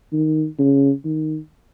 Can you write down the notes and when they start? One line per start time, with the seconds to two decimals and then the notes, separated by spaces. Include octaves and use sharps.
0.13 D#3
0.58 C#3
1.05 D#3